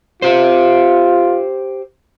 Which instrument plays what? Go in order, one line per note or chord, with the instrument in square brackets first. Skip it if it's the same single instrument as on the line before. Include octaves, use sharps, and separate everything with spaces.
[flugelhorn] F4 [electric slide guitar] G4 C5